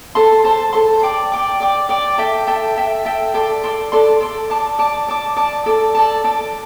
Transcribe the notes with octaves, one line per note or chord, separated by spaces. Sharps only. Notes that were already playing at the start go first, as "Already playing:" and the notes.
A4 C5 A5 C6
A4 C5 A5 C6
A4 C5 A5 C6
D5 G5 D6
D5 G5 D6
D5 G5 D6
D5 G5 D6
A4 E5 G5
A4 E5 G5
A4 E5 G5
A4 E5 G5
A4 D5 C6
A4 D5 C6
A4 D5 C6
A4 D5 C6
D5 A5 D6
D5 A5 D6
D5 A5 D6
D5 A5 D6
A4 D5 A5
A4 D5 A5
A4 D5 A5